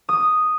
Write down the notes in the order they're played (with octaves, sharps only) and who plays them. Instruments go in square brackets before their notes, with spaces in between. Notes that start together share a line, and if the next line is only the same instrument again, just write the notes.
[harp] D#6